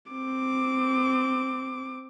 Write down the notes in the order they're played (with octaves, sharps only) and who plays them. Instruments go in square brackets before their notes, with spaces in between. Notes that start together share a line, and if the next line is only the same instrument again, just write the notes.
[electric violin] C4 D6